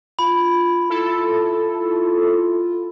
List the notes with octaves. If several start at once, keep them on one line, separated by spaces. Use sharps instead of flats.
F4 B5
E4 A4